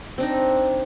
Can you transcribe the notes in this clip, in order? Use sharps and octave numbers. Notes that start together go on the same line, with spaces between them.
C4 D4 D#4